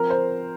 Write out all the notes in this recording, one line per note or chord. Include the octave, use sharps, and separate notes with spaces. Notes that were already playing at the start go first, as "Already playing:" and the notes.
Already playing: F3 C4 A#4
C5